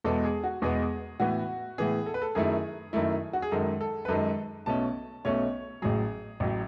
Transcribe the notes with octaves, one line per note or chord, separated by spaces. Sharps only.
E2 B2 G#3 B3 A4
G#4
F#4
E2 B2 G#3 B3 G#4
A2 E3 B3 F#4
A2 E3 B3 G#4
A4
B4
A4
F#2 D#3 A3 E4 G#4
F#2 D#3 A3 E4
F#4
G#4
F#2 D#3 G#3 A4
A4
B4
F#2 D#3 G#3 A4
B1 B2 A3 C#4 A5
B1 B2 A3 C#4 C#5
A1 A2 F#3 G#4
A1 A2 F#3